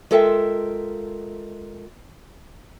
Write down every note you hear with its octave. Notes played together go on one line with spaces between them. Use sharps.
G#3 F4 A4 A#4 E5 G5